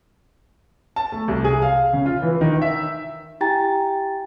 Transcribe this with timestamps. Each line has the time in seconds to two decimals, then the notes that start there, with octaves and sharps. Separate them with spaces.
0.96 A5
1.12 A3
1.28 C2
1.44 G#4
1.62 F5
1.93 C#3
2.06 F4
2.22 E3
2.41 D#3
2.62 E5
3.41 E4 G4 G5 G#5 A#5 A6